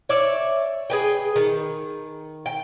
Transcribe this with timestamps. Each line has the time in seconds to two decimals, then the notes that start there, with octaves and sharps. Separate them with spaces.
0.09 C#5 D5 E5
0.90 G#4 B4 G5
1.36 D#3
2.46 G5